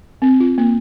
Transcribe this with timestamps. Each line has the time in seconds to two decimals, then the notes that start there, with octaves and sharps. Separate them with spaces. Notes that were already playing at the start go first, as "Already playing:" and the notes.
0.22 C4
0.40 F4
0.58 A#3